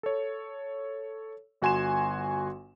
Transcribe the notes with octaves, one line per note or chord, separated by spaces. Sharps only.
A4 C#5
G1 F#4 G#5 C6 E7